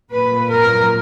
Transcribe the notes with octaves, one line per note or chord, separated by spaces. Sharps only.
A#2 B4
A#4